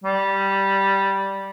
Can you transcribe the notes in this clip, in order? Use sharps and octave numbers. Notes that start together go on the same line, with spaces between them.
G3